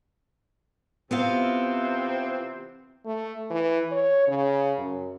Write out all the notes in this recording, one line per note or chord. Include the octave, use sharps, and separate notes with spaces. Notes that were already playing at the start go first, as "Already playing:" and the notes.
C3 E3 B3 C4 F4 F5
A3
E3
C#5
C#3
F#2